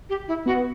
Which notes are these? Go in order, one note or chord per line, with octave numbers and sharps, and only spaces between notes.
G4
E4
B3 F#4